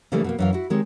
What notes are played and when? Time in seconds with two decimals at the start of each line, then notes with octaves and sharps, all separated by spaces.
0.12 C#3 E3 G3 A3 A#3 D4
0.24 B2 A3 A#3
0.39 F#2 E3 F5
0.53 E4 F#4
0.70 D#3 G#3 C4 G4 C#5